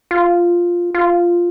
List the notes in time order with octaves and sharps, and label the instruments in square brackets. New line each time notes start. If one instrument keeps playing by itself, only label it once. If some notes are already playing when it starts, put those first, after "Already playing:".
[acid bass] F4
F4